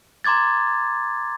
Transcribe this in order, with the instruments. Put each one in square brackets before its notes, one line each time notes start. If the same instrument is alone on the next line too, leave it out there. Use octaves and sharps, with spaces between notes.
[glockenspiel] A#5 C6 D6 G#6 A6